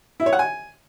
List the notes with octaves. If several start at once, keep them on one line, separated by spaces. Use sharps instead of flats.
E4
C#5
F#5
G#5